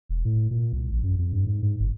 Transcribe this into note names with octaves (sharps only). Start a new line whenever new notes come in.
E1
A2
A#2
C2
A1
F#2
F2
G2
G#2
G#2
G1